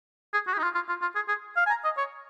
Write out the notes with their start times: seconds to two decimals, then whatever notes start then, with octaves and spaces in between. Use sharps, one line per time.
0.33 G#4
0.47 F#4
0.54 G#4
0.59 D#4
0.64 F4
0.75 F4
0.88 F4
1.02 F4
1.15 G#4
1.28 G#4
1.57 F5
1.67 G#5
1.70 A#5
1.84 D#5
1.98 C#5